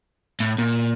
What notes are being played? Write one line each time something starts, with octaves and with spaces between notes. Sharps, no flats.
A2
A#2